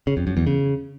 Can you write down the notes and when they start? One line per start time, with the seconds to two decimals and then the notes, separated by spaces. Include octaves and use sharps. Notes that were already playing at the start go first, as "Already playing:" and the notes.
0.07 C#3
0.17 F2
0.27 F#2
0.37 E2
0.47 C#3